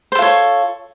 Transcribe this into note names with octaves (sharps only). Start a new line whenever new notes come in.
F4 A4 C5 C#5